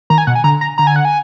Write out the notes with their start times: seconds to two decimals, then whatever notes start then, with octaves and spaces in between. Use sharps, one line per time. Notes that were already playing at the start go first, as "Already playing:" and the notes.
0.10 D#3 A#5
0.18 G#5
0.27 B2 F#5
0.35 G#5
0.44 D3 A#5
0.61 A#5
0.78 D3 A#5
0.87 G#5
0.96 F#5
1.05 G#5